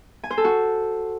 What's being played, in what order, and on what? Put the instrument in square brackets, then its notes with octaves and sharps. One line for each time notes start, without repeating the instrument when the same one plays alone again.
[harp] G#5
C5
A4
F#4